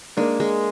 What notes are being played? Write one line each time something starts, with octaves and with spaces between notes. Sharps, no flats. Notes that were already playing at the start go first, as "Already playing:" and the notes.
G#3 A#3 D4
G#3